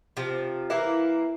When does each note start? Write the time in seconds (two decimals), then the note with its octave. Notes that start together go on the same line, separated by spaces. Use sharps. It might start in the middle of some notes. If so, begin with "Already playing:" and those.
0.17 C3 F3
0.70 E3 A#3 E4